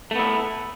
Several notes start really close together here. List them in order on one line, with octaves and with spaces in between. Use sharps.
A3 B3 E4